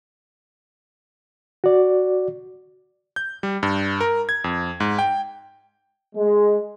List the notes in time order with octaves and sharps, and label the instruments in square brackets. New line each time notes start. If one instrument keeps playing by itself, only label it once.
[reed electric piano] F#4 D5
[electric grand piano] G6
G3
G2
A#4
G#6
F2
G#2
G5
[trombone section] G#3